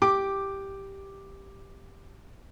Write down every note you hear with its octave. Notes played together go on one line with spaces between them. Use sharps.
G4 D6